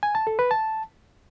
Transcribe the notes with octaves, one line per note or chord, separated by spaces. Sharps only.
G#5
A5
A4
B4
A5